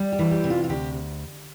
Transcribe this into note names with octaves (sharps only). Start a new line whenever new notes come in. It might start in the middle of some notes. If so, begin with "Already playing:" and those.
Already playing: G3
G4
E3
G4
C3
F4
F4
D2 G4